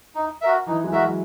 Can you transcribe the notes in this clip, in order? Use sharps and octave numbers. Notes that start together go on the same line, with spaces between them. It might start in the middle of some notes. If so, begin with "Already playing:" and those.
D#4
F#4 A#4 E5
E3 D#4
G#3
F#4 A#4 E5
F#3